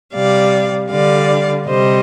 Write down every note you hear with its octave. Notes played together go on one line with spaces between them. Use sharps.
C3 G3 D5 F5
D3 G3 D5 F5
C3 G3 C5 D#5